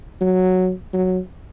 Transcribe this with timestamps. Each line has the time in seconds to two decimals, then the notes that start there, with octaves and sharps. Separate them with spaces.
0.21 F#3
0.93 F#3